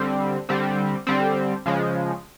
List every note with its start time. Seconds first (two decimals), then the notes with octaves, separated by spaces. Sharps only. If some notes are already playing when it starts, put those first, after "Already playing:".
Already playing: D3 G3 C4
0.49 D3 G3 C4
1.07 D3 G3 C4
1.66 C#3 F3 G#3